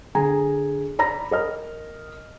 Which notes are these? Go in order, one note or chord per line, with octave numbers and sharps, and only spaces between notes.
D3 G#4 G#5 A#5
D5 A#5 B5 A#6
A#4 D#5 F6